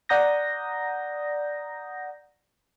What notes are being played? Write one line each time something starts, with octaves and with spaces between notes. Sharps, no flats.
D5 F#5 A#5 D#6 G6 A#6